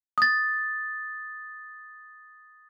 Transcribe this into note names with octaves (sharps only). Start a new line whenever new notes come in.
D#6 A6